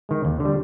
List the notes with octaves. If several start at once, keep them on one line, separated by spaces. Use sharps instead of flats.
D#3 G#3
D#2
D3 G3